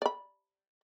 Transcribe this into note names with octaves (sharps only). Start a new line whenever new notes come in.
D5 B5